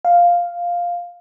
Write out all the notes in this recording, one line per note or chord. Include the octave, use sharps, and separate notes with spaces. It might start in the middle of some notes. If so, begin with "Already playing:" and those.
F5